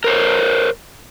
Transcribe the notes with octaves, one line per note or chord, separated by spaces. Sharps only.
A#4 C5 C#5